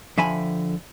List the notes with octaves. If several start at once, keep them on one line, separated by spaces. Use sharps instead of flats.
D3 F3 E5 G5 G#5 B5